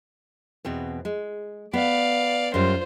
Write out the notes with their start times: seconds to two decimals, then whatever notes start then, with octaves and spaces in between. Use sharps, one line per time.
0.65 E2 B2 C4
1.05 G#3
1.73 B3 D5 F5
2.54 F#2 G3 F4 C5